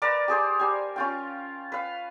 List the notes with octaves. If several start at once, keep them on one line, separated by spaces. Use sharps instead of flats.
A#4 B4 D5 A5
G4 G#4 C5
G3 G#5
C#4 F4 G5
B4 F5